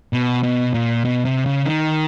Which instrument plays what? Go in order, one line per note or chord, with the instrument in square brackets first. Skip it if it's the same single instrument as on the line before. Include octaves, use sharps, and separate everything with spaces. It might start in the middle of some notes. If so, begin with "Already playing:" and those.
[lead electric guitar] B2
B2
A#2
B2
C3
C#3
D#3